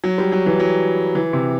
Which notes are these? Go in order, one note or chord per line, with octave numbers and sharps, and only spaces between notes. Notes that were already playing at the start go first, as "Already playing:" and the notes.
F#3
G3
F#3
E3
F#3
E3
C3